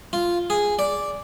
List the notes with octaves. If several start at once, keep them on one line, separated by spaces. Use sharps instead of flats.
F4
G#4
D5